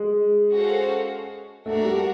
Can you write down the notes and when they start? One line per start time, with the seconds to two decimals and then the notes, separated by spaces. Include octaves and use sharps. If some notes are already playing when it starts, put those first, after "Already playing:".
Already playing: G#3
0.52 C#4 F#4 A4 C5 F5
1.66 A3 D4 F#4 A#4
1.85 G3